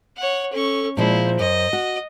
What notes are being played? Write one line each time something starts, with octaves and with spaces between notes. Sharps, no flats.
C#5 F#5
C#4 A4 C#6
A#2 F3 G#3 E4 C5
F#2 D#5
F#4